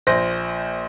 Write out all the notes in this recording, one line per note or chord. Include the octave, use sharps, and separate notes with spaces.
A#1 C5 A#6